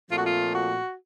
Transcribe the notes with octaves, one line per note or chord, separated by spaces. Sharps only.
A#2 F3 A3 C4 F4
F#4
F4
F#4